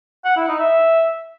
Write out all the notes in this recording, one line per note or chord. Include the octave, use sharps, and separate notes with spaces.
F#5
E4
D#4
E5